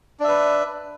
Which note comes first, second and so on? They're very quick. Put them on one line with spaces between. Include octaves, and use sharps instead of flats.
D4 E5 B4